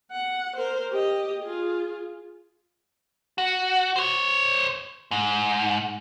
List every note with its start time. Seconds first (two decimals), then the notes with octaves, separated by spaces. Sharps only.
0.12 F#5
0.56 A#4 C5
0.91 G4 D#5
1.42 F4 G#4
3.38 F#4
3.96 C5 C#5
5.11 G#2